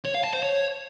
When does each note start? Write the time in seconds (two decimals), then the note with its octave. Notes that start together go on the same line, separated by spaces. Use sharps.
0.05 C#5
0.14 F5
0.24 A5
0.33 C5
0.43 C#5